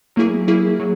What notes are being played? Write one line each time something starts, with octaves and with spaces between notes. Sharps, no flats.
F#3 A#3 E4 G#4
F#3 A#3 E4 G#4
F#3